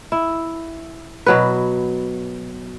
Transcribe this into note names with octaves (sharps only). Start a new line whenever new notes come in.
E4
B2 F#3 B4